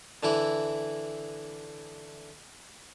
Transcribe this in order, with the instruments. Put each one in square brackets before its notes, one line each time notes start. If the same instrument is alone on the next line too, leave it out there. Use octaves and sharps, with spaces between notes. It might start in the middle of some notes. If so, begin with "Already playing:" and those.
[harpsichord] D3 E3 E4